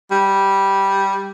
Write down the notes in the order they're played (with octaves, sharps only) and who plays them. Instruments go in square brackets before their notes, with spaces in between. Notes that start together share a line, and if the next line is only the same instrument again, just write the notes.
[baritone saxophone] G3